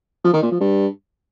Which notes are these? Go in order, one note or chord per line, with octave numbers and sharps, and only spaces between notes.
F3
D#3
A#2
F3
G2